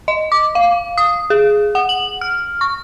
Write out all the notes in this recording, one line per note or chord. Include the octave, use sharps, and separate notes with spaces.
D#5
D6
F5
D#6
G#4
F#5
F#7
F6
C#6